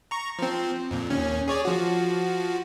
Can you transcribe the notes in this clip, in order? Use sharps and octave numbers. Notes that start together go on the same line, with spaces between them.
A#5 C#6
F3 C4
F2 A#2
D#2 C#4
G#4 C#5 D5
F3 F#4